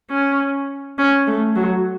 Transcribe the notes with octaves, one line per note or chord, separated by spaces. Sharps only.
C#4
C#4
A3
F#3